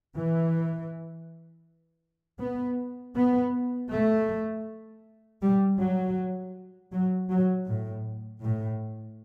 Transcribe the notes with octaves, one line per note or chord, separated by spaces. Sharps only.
E3
B3
B3
A3
G3
F#3
F#3
F#3
A2
A2